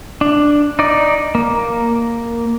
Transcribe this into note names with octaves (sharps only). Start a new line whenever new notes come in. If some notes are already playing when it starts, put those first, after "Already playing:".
D4
D#4 D5
A#3